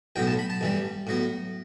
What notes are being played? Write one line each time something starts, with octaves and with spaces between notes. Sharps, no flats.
B1 A2 F#3 B3 G5
A5
B5
A5
A1 G2 E3 G3
A2 F#3 B3